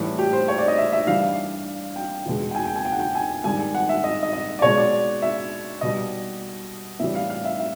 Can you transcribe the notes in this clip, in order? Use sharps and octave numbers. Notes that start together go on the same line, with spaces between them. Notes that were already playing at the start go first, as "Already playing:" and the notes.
Already playing: A2 E3 G3
G4
C5
C#5
D5
D#5
E5
E5
G2 E3 G3 F5
G5
E2 B2 G#3
G5
G#5
G5
G#5
G5
F#5
G5
G#5
G#2 D#3 G3 G#5
F#5
E5
D#5
D#5
D#5
D5
B2 G#3 C#5
D5
E5
B2 G3 D#5
A2 E3 G3 E5
F5
F5
E5
E5